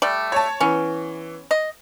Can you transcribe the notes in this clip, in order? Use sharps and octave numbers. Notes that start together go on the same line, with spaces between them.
G3 A3 D5
C#5 A5
E3 B3 C#4
D#5